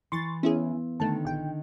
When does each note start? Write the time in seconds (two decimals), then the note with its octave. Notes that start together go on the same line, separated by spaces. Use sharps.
0.12 E3 C6 C#6 A6
0.43 B3 C#4 E4 G#4
1.00 D3 D#3 A3 A5
1.25 A#1 G5